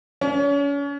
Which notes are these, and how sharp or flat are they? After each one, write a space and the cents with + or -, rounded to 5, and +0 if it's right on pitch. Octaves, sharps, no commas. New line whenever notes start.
C#4 +35